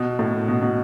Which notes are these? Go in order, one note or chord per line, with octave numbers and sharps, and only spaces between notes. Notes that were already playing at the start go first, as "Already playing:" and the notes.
Already playing: B2
A2
B2
B2